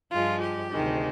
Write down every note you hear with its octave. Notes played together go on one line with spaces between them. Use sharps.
G2 F3 G#3 F4
G4
D2 C3 D#3 G#3